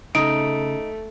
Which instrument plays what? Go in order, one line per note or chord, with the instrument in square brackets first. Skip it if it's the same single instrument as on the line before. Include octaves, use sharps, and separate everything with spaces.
[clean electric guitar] C#3 [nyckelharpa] A3 [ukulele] D#4 [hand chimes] D7